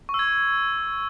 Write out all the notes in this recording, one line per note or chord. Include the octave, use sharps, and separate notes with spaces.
C#6
E6
G#6